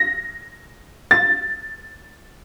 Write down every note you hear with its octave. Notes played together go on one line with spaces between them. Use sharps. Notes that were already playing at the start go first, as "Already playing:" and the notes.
Already playing: A#6
A6